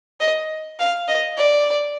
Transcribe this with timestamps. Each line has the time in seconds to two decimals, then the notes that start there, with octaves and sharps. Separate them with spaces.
0.20 D#5
0.79 F5
1.08 D#5
1.38 D5